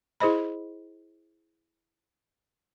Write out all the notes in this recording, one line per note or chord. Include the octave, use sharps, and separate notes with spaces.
E4 G#4 C5 D#5 B5